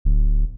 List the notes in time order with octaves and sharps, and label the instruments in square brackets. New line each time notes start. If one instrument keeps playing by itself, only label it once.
[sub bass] D1